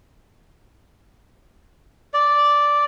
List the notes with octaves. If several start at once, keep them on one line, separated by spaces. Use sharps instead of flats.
D5